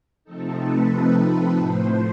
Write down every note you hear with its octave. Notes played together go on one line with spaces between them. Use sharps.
C3 F3 A3 C4 D#4 A4
B4
A2 F3 A3 C5